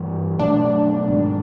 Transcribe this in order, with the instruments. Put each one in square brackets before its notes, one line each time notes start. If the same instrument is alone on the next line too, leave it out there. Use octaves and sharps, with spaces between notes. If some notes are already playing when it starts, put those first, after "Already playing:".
Already playing: [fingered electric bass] G2 E3 G3
[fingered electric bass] B2 F#3 A3 [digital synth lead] D4
[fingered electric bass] G#2 D#3 G#3